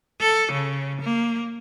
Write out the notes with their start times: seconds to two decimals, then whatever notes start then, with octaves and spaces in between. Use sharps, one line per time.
0.21 A4
0.52 C#3
1.01 A#3